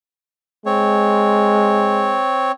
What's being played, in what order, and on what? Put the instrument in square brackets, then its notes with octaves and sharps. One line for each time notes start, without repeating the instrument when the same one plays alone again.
[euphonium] G#3 [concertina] C4 C#5